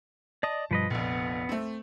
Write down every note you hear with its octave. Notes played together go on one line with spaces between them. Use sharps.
D5 D#5 A5 D#6
G2 B2 F3 G3 B4 D#5
F1 A#1 A#2 B3
A3 C4